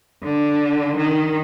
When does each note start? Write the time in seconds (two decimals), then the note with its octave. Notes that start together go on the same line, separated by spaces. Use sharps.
0.23 D3
0.97 D#3